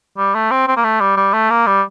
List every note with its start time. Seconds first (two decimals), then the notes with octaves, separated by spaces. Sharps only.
0.18 G3
0.35 A3
0.51 C4
0.67 C4
0.77 A#3
0.84 A3
1.01 G3
1.17 G3
1.33 A3
1.50 A#3
1.67 G3